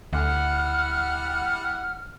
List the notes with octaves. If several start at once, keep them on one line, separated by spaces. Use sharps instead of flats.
D2 G3 E4 F#5 F6